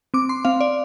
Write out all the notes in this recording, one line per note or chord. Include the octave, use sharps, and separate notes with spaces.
C4 D6
C6
C4 F5
D5